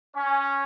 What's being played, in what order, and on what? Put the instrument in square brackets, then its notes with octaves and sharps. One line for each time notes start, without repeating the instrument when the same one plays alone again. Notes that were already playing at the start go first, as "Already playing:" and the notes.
[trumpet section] C#4